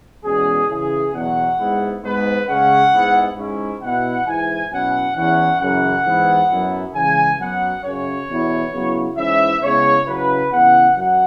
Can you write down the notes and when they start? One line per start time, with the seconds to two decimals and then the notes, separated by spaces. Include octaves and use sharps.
0.24 E2 B2 G#3 C#4 G#4
0.69 C#3 E3 C#4 E4 G#4
1.13 E2 B2 F#3 F#5
1.59 G#2 G#3 B3 E4
2.03 G#2 G#3 B3 B4
2.47 C#3 G#3 C#4 F#5
2.92 G#2 G#3 B3 E4
3.37 G#2 G#3 C#4 E4
3.82 B2 B3 E4 F#5
4.26 G#2 E3 G#3 E4 G#5
4.71 B2 F#3 C#4 E4 F#5
5.15 E2 E3 C#4 F#5
5.60 F#2 C#3 E3 F#5
6.05 G#2 E3 B3 E4
6.49 F#2 F#3 B3 E4
6.94 C#3 E3 G#3 G#5
7.39 F#2 F#3 B3 F#5
7.83 F#2 C#3 F#3 C#4 C#5
8.29 E2 B2 B3 E4
8.72 C#3 F#3 B3 E4
9.17 G#2 E3 C#4 E4 E5
9.62 C#3 G#3 B3 E4 C#5
10.06 C#3 F#3 C#4 E4 B4
10.51 C#3 E3 B3 E4 F#5
10.96 F#2 F#3 F#5